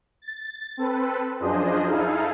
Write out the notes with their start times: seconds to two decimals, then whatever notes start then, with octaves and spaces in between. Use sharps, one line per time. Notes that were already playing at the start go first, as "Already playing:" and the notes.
0.22 A6
0.77 C4 A4 B4
1.40 F#2 F3 D4 G#4 C5 D#5
1.88 D#4 E4 G#4 A4 F5